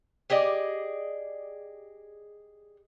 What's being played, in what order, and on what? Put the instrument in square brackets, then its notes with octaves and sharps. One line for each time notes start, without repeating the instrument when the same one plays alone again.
[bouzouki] G4 G#4 D5 D#5